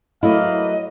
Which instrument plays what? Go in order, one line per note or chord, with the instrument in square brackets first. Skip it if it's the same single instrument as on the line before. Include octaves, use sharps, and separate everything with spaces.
[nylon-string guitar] F#3 A3 E4 [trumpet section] A#3 B4 F5 [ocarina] D#5